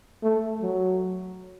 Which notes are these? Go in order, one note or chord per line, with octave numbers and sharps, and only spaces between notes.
A3
F#3